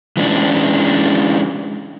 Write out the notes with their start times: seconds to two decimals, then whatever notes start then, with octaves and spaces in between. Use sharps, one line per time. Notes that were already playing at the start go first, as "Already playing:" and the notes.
0.17 E3 G#3 C#4 D4